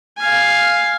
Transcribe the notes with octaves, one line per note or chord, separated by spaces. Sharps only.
F5 G#5